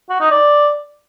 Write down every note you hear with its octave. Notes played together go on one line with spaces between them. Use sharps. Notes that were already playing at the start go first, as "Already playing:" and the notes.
F#4
D#4
D5